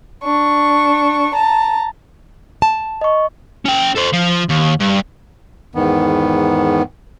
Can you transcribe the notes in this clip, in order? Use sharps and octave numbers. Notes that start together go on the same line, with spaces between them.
D4 C#6
A5 A#5
A5
D#5 C#6
C#4 G5
A4 C5
F3
D#2
G2
E2 G#2 D#3 B3